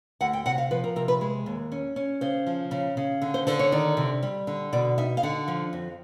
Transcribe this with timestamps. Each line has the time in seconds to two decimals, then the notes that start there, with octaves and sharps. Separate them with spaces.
0.21 D2 F#5
0.33 G5
0.46 C3 F#5
0.58 F5
0.71 F3 B4
0.84 A#4
0.96 C3 A#4
1.08 B4
1.21 G#3
1.46 D#2
1.72 C#4
1.96 C#4
2.21 C#3 C5
2.47 F3
2.71 C#3
2.97 C#3
3.22 D3
3.34 C5
3.47 D3 C5
3.59 C#5
3.72 D#3 D5
3.97 C3
4.23 G3
4.47 D3
4.72 B2 D5
4.98 D#4 E5
5.17 F5
5.23 D3 F#5
5.48 F3
5.73 F2